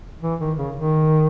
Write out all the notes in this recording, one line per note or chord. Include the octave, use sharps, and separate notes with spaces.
E3
D#3
C#3
D#3